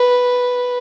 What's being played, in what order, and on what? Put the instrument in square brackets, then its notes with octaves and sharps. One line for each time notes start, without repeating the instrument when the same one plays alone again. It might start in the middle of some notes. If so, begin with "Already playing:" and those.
Already playing: [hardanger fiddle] B4